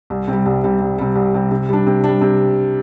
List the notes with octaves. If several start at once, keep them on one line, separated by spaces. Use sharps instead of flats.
C2
C3 G3
C2
C3 G3
C2
C3 G3
C2
C3 G3
C3
G3 D4
C3
G3 D4
C3